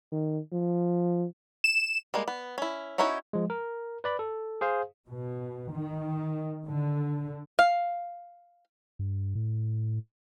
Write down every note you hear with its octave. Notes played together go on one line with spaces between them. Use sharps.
D#3
F3
E7
G3 G#3 A#3
B3
C#4 E4
C#4 D#4 E4 F#4 C#5
F3 G#3
A#4
B4 D5 B5
A4
G#4 C5 F5
B2
D#3
D3
F5
G2
A2